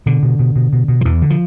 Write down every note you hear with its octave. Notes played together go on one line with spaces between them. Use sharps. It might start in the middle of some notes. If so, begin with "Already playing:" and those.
B2 D3
B2
B2
B2
B2
B2
F3
E2 E3
D3
F3